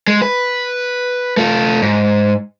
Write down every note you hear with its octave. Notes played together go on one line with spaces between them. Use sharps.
G#3
B4
A3 F4
G#2